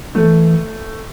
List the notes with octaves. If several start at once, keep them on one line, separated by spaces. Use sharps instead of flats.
E3 A3